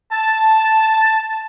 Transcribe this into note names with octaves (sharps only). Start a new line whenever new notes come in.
A5